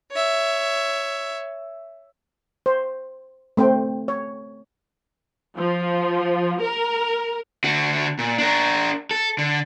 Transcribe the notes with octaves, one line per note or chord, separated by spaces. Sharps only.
C#5 E5
C5
A3 C4 C5 G5
C#5
F3
A#4
D3 F#4
A#2
D4 A#4
A4
D3